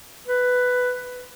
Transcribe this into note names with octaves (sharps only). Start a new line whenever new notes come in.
B4